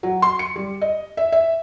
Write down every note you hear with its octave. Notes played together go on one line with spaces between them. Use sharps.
F#3
C6
C#7
G3
D#5
E5
E5